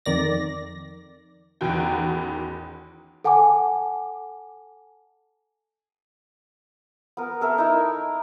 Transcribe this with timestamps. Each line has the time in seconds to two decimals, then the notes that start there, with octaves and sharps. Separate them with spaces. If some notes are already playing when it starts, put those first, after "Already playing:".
0.06 F2 D#3 D5 A#6
1.61 A1 E2 D#3 F#4 G5
3.24 A4 F#5 G#5 A5 D6
7.17 B3 A#4
7.41 A4 A#4 E5
7.58 D#4 E4